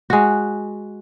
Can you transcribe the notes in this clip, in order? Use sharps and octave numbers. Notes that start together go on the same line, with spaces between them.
G#3 F#4